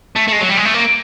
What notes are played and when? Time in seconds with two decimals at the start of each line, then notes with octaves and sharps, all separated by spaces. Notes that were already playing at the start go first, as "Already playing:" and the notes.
0.16 A3
0.28 A3
0.32 G#3
0.41 F#3
0.49 G3
0.57 G#3
0.65 A3
0.74 A#3